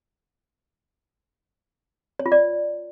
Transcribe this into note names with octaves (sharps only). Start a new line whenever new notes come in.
C#5
F4
D5